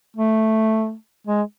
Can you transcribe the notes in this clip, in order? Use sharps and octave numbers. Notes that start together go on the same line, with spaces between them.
A3
G#3